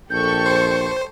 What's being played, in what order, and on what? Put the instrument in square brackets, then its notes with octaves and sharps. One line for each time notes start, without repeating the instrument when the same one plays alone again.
[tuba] A#1 [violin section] G4 A4 C#6 [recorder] G6
[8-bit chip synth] C5